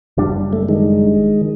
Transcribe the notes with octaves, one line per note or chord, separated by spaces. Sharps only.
F#1 G3 D4
A3
D#3 G#3